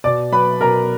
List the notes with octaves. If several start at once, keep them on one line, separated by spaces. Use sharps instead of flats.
B2 D5 D6
F#3 B4 B5
B2 A#4 A#5